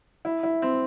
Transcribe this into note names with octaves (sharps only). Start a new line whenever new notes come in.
E4
E4
C4